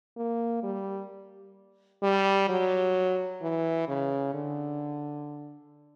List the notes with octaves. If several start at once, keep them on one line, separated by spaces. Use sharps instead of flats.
A#3
G3
G3
F#3
E3
C#3
D3